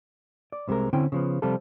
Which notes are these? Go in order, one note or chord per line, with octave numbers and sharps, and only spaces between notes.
D5
C2 C3 F3 G#3 A#4
D3 C4 C#4 E4 G5
C#3 F3 B3
C3 F3 G3 F4 A4